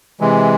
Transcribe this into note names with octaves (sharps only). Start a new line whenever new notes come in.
C3 E3 G#3